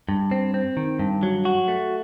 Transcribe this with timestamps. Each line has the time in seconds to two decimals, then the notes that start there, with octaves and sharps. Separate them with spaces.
0.09 G2
0.31 C4
0.54 C4
0.77 D#3
0.99 G2
1.23 F#3
1.45 F#4
1.68 A3